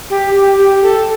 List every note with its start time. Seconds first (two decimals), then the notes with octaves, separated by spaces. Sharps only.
0.10 G4
0.35 G4
0.58 G4
0.83 A4